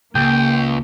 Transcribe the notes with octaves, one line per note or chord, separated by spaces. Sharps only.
C#2 A#3 G5